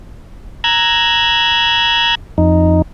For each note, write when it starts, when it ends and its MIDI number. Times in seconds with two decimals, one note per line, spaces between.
0.64 2.15 82
0.64 2.15 88
0.64 2.15 90
0.64 2.15 92
2.38 2.82 41
2.38 2.82 63